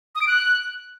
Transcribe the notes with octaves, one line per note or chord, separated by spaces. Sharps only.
D#6
D7
F#6